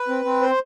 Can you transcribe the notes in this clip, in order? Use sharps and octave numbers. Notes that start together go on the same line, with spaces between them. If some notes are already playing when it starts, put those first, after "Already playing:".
Already playing: B4
C4
C4
C5